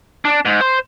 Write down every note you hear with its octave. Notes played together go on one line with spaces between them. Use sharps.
D4
G#2
C5 C6